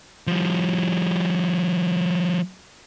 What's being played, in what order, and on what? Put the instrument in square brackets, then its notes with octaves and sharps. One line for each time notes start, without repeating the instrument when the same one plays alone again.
[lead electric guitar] F3 G3